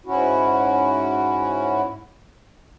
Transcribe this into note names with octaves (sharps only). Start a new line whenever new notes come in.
G#2 C#4 E4 F#4